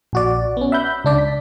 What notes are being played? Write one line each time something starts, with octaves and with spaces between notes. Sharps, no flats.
A#1 F#4 D5
B3 C#4
E5 F#5 B5 G6
C#2 D4 D5
B6